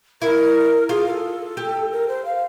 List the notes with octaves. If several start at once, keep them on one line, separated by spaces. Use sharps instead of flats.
E4 A#4
F4 G#4
A#4
A4
G4
A#4
C5
F5